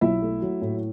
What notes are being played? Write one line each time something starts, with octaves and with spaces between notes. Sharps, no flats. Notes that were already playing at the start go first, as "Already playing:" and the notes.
B1 E4 E5
A3
F#3
A2